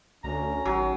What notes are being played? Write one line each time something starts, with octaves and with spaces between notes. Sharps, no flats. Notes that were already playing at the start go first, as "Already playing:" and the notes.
D2 C#4 A#5
G#1 F#3